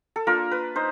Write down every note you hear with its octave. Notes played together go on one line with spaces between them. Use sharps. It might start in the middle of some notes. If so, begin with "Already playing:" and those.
A4
A#3 D4 F4 A#4
B4
D#4 C5